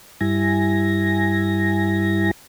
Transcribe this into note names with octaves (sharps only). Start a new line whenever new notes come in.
G2 G3 E4 G#5 A#6